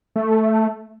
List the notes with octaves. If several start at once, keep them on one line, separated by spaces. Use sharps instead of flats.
A3